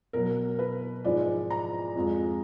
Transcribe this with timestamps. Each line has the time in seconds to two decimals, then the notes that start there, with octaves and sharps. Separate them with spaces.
0.13 B2 F#3 A#4
0.59 B4
1.04 G#2 F3 G#3 D5
1.50 A#5
1.95 F2 F3 G#3